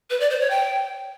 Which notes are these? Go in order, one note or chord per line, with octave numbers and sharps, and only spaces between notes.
B4
D5
C5
C#5
G5